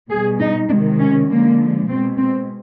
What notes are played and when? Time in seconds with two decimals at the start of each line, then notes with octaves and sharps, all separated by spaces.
0.10 B2 G3 G#4
0.40 D#4
0.69 C3 D#3 G#3 D4
1.00 C#4
1.29 D3 F3 G#3 A#3
1.87 B2 G#3 C4
2.17 C4